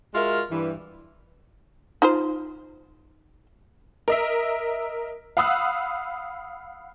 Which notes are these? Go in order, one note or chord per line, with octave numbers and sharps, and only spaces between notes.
G#3 F4 F#4 A#4 E5
G2 E3
D#4 F4 C5
A#4 D#5 E5
F5 F#5 B5 D#6 E6 F#6